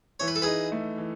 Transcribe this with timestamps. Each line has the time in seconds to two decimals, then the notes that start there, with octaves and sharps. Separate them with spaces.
0.20 E3 C#5
0.28 B4
0.35 A4
0.42 D#4 G#4 B4
0.72 A3
0.98 E3